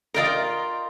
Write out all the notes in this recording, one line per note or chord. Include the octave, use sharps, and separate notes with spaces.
F4 A#4 D5 D#5 G5 A#5